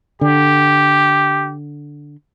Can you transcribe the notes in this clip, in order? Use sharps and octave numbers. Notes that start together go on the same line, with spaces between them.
D3 G4